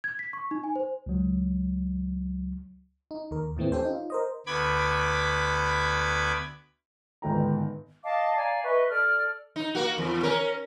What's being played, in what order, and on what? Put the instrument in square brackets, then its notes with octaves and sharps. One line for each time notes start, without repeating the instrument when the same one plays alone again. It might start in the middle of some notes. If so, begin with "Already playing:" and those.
[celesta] G#6
B6
C#6
D#4
G#5
C5
[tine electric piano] C#2 F#3
[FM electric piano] D#4
D#2 A#4
D#2 A2 E3 A3 C4
C#4 G4 A4 C5
D#4 F4
A#4 C5 D#5
[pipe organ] D2 B3 B5 D6 G#6
[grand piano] G1 G#2 D#3 G5 A#5
[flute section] D#5 F5 A5 D6
D5 F5 G#5 A#5
B4 D#5 E5 C#6
A4 D5 F6
[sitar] D#4
A#3 F#4
E2
C#4 A#4